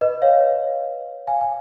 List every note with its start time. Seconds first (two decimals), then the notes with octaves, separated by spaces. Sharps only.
0.01 B4 D#5
0.22 C#5 F5
1.27 F5 G#5
1.41 G#5